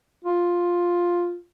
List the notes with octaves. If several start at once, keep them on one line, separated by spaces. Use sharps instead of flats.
F4